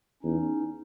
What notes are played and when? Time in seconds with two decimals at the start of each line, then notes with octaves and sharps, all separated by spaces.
0.23 E2 C#4 D#4